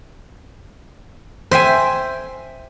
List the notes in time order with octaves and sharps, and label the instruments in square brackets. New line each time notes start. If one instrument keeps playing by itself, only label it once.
[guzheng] C5 E5 G5 G#5